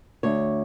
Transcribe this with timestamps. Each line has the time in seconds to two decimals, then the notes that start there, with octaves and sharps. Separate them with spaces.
0.23 D2 C#5